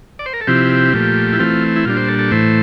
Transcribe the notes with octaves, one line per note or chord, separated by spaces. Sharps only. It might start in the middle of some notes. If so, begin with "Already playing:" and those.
D5
C5
A#4
A4
C3 F3 C4 E4 G4
A#2 F3 A3
E4
E3 A3 C4 F4
E4
A#2 G3 D4 F4
C5
A4
A4
A2 E3 A3 C5